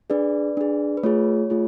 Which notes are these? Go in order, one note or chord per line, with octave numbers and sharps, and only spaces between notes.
D4 G#4 B4 D5
D4 G#4
B4
A3 F4 G#4 C#5
A3 F4 G#4